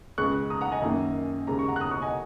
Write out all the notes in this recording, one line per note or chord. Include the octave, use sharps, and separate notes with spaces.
C#2 C#3 G#3 C#6 F#6
A#5 D#6
F#5 A#5
D#5 G#5
F#2 D#3 A#3
D#2 C#3 G#3 A#5
C#6
F#5 A#5
F#6
A#5 D#6
C#6 F#6
D#5 G#5